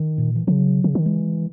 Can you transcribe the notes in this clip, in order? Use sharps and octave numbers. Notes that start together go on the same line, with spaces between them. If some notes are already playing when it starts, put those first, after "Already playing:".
Already playing: D#3
A#2
E3
C#3 F#3
C#3
D#3
E3 G#3